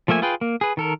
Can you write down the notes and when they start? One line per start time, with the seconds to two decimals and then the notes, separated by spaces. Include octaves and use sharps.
0.08 F3 A3 A#3 E5 G#5
0.22 F4 G#4 B4 G5
0.41 A#3
0.61 G#4 B4
0.77 D#3 A4 A#4